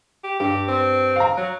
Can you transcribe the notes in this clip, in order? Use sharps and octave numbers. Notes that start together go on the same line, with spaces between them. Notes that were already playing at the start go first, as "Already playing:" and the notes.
G4
G2 G4
C4
F5 A#5
F#3